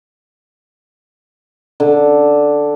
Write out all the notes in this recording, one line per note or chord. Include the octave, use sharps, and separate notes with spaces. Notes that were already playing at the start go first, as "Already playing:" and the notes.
D3